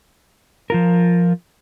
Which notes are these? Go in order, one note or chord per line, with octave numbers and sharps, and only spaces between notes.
F3 F4 A#4